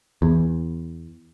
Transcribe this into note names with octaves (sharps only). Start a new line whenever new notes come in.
E2